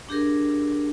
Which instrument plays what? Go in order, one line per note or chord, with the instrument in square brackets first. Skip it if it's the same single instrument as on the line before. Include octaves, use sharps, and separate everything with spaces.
[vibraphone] D4 G4 G#4 A#4